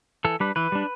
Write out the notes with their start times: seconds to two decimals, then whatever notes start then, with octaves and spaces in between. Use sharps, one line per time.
0.25 E3 A4
0.40 G3 D4 B4
0.56 E3 B4
0.72 G3 D4